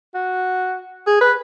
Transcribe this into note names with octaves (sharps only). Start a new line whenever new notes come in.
F#4
G#4
B4